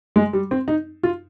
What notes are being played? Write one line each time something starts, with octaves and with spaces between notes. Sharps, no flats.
G#3
G3
C4
D#4
F4